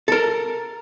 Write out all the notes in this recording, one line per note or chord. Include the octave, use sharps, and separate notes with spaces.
A4 A#4